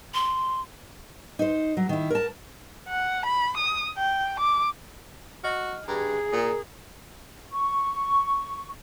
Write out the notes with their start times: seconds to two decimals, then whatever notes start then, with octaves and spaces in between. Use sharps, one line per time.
0.14 C6
1.39 D#4 C5
1.77 F#3
1.89 D#3 E4
2.10 A#4 A5
2.89 F#5
3.26 B5
3.57 D#6
3.98 G5
4.40 D6
5.44 F#4 D#5 F6
5.88 G2 G#4 A#5
6.32 A#2 A#4 A#5 D#6
7.49 C#6